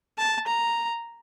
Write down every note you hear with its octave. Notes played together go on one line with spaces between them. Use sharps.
A5
A#5